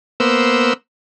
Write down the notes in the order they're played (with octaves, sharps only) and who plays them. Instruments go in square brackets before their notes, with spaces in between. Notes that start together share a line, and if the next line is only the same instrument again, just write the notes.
[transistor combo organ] A#3 B3 C5 E6